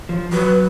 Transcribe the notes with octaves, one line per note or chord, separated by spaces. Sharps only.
F3
F#3 B4